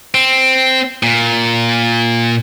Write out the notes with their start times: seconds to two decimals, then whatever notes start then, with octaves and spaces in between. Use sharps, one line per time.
0.14 C4
1.03 A#2